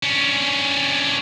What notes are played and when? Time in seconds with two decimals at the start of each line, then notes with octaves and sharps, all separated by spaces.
0.03 C#4 D4